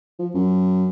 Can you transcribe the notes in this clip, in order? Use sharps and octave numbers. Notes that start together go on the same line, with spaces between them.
F3
F#2